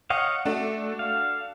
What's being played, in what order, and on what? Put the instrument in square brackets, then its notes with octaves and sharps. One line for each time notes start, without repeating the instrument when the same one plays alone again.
[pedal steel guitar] C#5 D#5 F5 [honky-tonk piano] F#5
[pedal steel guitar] A3 [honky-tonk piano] D4 F#4 A4
[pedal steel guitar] F5